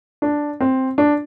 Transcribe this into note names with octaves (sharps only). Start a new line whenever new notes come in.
D4
C4
D4